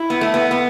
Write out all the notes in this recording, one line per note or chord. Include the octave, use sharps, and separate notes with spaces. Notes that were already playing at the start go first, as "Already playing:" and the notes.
Already playing: E4
B3
A3
B3
B3